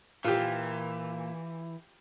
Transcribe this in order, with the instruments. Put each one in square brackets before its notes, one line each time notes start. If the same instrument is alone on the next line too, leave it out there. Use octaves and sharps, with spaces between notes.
[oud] A#2 [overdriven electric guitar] E3 [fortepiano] F4 G4